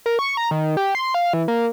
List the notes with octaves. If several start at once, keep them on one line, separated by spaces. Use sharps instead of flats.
A#4
C#6
A#5
D#3
G4
C6
F5
E3
A#3